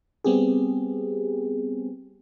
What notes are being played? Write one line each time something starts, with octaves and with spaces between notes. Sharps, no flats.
G3 B3 C4 G4 G#4